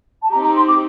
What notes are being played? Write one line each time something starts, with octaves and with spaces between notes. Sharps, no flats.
A5
C4 D#4 G4 A#5
A#5
C6
D6